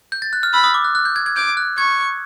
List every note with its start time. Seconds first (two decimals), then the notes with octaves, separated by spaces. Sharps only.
0.12 G6
0.22 A6
0.33 F#6
0.43 F6
0.53 B5 E6
0.64 D#6
0.74 D6
0.84 F#6
0.95 F#6
1.05 G6
1.16 G#6
1.26 G#6
1.36 D6 G6
1.57 F#6
1.78 C#6 G#6